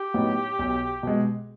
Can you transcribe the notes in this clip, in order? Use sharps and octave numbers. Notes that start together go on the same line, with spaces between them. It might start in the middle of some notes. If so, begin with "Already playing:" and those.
Already playing: G4
A2 F#3 B3 D#4
B1
B2 G#3